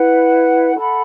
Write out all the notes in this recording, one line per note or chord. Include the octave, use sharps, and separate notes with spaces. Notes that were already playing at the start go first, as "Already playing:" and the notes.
Already playing: E4 B4 F#5
A4 F#5 B5